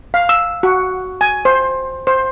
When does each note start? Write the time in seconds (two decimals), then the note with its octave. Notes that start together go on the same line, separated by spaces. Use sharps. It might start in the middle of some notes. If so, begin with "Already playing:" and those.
0.14 F5
0.29 E6
0.63 F#4
1.21 G#5
1.45 C5
2.07 C5